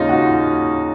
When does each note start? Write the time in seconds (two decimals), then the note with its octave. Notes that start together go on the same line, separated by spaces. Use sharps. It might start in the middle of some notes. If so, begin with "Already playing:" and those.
Already playing: D#2 C#3 G#3 C#4 D#4 F4
0.09 F#4